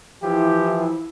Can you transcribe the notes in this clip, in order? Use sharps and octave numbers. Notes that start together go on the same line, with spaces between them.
E3 F3 E4 G4